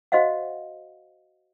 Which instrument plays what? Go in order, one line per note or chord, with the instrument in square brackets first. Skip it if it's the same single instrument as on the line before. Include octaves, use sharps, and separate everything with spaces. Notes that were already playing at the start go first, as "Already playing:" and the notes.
[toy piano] F#4 C5 D#5 F5 F#5